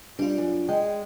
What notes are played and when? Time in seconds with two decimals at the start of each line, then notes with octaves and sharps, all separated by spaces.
0.19 G3 D4 F4
0.38 F#2
0.69 G#3 G5